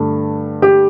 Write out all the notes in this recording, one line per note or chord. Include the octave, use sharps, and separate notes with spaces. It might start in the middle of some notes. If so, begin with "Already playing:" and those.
Already playing: G2 D3 A3
G4